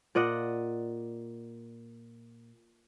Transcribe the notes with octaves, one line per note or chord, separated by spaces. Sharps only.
A#2 D5 D#5 F#5